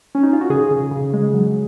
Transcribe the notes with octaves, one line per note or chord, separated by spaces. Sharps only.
C#4
D#4
F4
F#4
C#3 G#4
C#3
C#3
G#3
F#3